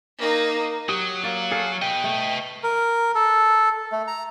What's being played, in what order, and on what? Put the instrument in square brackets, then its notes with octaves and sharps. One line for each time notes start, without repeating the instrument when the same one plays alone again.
[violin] A#3 D#4
[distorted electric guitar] F#3 [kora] G4 [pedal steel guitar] D#6
[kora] A#3 D5 F5
[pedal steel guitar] G#4 F5 [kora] A4 C#5
[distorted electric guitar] B4 D#5 [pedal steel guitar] G5
[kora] A3
[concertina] A#4
A4
A3
A#5